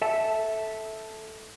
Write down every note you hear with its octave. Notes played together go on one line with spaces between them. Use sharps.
A4 E5 A5